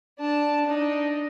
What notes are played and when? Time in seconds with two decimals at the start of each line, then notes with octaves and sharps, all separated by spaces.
0.19 D4 A5
0.66 D4 D#4